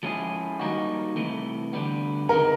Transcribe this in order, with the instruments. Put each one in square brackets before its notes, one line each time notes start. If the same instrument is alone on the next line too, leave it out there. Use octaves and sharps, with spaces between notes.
[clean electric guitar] F3 G#3 C#4 E4 G#4
D#3 G3 A#3 D#4 F#4
C2 C3 E3 A3
D2 D3 G3 B3
[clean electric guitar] C#2 C3 D#3 G#3 [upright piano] A#4